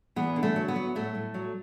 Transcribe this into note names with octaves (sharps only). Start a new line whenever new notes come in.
E2 B3
D3
A3
F#3
B3
F#3
A2 A3
A2
F#3